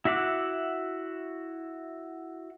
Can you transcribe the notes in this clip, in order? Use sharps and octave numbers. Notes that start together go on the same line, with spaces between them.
E4 F#4 E5 F#5 D6